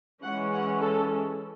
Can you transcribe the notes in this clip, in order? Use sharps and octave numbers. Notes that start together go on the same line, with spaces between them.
E3 G#3 C#4 F#5
F#5
A4